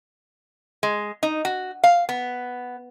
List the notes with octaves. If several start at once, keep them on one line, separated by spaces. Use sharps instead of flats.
G#3
D#4
F#4
F5
B3